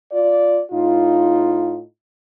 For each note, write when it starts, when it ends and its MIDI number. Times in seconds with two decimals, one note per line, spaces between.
0.12 0.60 65
0.12 0.60 74
0.71 1.80 45
0.71 1.80 63
0.71 1.80 65